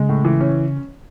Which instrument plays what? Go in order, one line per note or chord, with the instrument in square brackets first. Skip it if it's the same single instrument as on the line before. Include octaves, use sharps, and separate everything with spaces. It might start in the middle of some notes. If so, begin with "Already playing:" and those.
Already playing: [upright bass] C#3 [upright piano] G#3
[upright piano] A2
E3
C#4